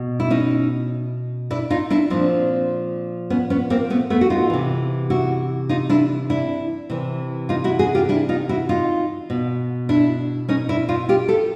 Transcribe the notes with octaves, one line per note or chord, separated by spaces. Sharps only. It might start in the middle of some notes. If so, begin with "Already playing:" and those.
Already playing: B2
E4
C#4 D#4
D4 E4
D#4 F4
D4 E4
A#2 F3 C4 D4
B3 C#4
B3 C#4
A#3 C4
A3 B3
A3 B3
F#4
D#4 F4
C3 E3
E4 F#4
D#4 F4
D4 E4
D4 E4
C3 E3
D#4 F4
E4 F#4
F#4 G#4
F4 G4
D4 E4
D#4 F4
E4 F#4
D#4 F4
B2
D4 E4
C#4 D#4
D4 E4
D#4 F4
F4 G4
G4 A4